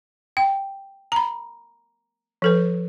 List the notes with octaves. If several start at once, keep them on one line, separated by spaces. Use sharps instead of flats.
G5
A#5 B5
F3 A4 B4